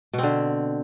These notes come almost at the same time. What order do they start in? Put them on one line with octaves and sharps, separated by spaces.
B2 C4 D3